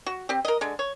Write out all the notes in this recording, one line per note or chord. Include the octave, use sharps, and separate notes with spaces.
F#4
C4 G4
A#4 D#5
D3 G#3
C#5